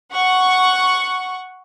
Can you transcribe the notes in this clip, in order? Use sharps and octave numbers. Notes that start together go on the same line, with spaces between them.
F#5 C#6